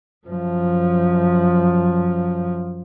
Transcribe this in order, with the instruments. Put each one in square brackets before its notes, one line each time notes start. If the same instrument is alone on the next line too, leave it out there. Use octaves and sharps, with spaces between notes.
[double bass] F#2 F3